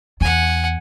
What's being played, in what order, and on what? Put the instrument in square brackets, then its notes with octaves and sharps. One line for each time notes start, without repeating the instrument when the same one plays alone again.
[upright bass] E2 [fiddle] F#5 G#5